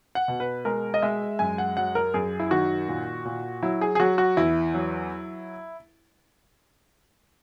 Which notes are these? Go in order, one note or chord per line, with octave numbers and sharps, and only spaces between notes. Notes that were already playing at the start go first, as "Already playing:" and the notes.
F#5
B2
B4
G#3 A#4
D#5
G#3 E5
F#2 G#5
F#5
F#3 F#5
A#4
F#2 G#4
E4
D#3 F#4
A#2
A#2
F#3 E4
G#4
G#4
F#3 F#4
F#4
E2 E4
F#3